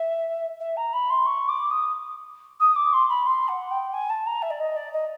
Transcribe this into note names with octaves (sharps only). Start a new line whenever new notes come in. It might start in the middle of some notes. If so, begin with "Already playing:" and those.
Already playing: E5
E5
A#5
B5
C6
C#6
D6
D#6
D#6
D6
C6
B5
C6
F#5
G5
G#5
A5
A#5
E5
D5
D#5
D5
D#5